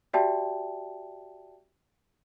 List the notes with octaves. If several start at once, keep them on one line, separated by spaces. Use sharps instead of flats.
F#4 G4 D5 E5 G5 A5